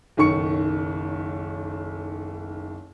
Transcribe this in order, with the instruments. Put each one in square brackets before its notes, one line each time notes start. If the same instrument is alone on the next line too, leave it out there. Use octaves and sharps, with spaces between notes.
[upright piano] F#1 B1 D#3 C#6 C#7